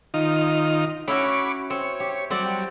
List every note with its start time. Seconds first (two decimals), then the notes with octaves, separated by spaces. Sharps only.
0.14 D#3 D#4 F4
1.08 C#4 E4 F#4 B5 C#6 D6
1.70 C4 C#5
2.00 G4
2.30 F#3 G3 C4 D5